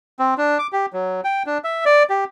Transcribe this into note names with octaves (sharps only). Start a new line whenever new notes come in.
C4
D4
D6
G4
F#3
G5
D4
E5
D5
G4